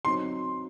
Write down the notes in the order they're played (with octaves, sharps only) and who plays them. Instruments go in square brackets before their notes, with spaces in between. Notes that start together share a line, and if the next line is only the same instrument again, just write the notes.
[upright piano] F#3 C4 D#4 [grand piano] C6